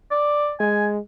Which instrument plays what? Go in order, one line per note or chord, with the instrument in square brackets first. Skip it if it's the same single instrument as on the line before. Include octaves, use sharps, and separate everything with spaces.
[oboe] D5
[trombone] G#3 [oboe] G#5